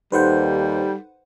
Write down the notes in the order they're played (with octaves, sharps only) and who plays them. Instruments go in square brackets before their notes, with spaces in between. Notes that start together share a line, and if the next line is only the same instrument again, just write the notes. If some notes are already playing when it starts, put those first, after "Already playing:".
[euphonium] D#2 [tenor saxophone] G3 [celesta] D#4 A4 G6 [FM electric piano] B4 C5 F#5